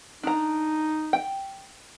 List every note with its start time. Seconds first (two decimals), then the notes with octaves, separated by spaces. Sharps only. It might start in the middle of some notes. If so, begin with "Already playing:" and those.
0.23 D4 D#4 A#5
1.13 G5